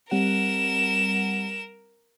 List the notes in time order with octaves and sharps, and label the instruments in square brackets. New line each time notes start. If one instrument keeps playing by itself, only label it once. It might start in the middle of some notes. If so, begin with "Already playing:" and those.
[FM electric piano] G3 C4 F#5 [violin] A#4 E7